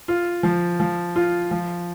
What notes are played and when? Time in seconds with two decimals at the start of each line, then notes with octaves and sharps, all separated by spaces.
0.08 F4
0.43 F3
0.80 F3
1.16 F4
1.51 F3